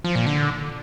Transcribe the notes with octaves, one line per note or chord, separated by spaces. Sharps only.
F3
A#2
D3